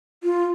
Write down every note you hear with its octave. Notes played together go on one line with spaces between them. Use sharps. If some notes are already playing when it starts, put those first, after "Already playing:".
F4